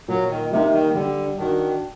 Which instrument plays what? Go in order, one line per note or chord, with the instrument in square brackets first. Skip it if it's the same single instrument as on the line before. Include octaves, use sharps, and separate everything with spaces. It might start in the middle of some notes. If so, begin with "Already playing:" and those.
[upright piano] A#2 [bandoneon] F#3
[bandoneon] D#3
[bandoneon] C3 [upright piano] G3 A#3 D#4
[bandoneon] D#3
[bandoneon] D3 [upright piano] G3
[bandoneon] D#3 [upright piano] D4 F#4